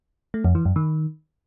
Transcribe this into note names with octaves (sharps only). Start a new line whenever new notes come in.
A3
F2
E3
F#2
D#3